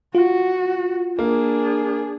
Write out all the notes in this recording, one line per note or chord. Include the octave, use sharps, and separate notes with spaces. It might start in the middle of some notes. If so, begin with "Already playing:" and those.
F4 F#4
A#3 D4 G#4